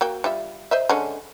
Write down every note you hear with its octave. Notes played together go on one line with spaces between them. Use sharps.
A#3 F#4 G5
G3 F4 E5
C5 D#5 E5
D3 G#3 C#4